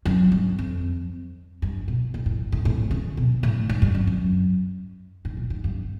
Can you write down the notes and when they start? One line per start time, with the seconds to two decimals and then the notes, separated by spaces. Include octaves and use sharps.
0.05 F#2
0.32 G2
0.59 F2
1.62 G2
1.88 B2
2.14 A#2
2.26 A2
2.52 A2
2.65 A2
2.91 C#3
3.17 B2
3.43 A2
3.69 G#2
3.82 G2
3.95 F#2
4.07 F#2
5.25 G#2
5.37 A#2
5.50 G#2
5.64 G2